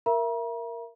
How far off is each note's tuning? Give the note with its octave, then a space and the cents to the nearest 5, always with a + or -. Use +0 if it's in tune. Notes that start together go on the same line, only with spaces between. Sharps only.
A#4 +0 E5 +25 A#5 +40